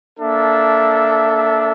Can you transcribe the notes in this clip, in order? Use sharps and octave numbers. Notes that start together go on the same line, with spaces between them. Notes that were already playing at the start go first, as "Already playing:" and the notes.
A#3 D4 A4 E5